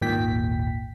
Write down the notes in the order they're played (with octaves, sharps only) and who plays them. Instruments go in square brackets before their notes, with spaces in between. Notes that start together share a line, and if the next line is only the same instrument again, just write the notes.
[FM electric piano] G#1 D#2 A#2 G5 B6